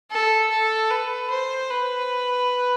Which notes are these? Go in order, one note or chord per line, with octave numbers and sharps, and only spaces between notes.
A4
A4
B4
C5
B4